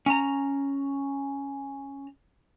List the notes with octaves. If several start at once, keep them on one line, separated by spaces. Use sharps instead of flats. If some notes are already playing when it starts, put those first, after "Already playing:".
C#4 A#5